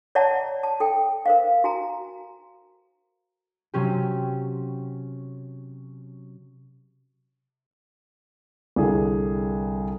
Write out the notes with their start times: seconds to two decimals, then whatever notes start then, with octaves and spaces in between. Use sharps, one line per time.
0.15 C#5 D5 E5 F#5 A5 A#5
0.63 A5
0.80 A4 G5
1.26 A#4 C5 F5
1.64 F#4 G#5 A#5
3.74 C3 F#3 C#4 G4
8.76 C2 D3 G#4 A#4